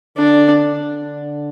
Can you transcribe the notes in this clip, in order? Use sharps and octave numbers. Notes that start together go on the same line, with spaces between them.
D3 D4
D3